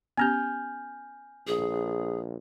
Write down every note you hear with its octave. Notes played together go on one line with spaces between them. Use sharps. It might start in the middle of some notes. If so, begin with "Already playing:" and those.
B3 C#4 G4 G#5 F6 G6
A#1 G#4